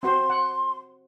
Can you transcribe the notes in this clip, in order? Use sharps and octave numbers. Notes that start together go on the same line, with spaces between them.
C4 F#4 C5 C6
F#5